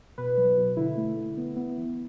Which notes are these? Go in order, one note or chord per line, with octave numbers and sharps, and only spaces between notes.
B2 B4
F#3
B2
D3 E4
A3
D3
B3
B3
E3